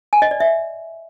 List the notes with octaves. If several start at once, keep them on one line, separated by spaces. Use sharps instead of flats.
G#5
D#5
D5
E5